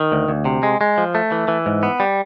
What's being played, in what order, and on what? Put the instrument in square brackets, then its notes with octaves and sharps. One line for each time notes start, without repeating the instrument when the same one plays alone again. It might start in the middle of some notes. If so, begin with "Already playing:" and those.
Already playing: [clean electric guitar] D#3
D2
D2
C3
G#3
G#3
F3
A3
E3
E3
G#2
B3
G3